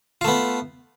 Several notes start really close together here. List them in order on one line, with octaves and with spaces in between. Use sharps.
F4 A3 B3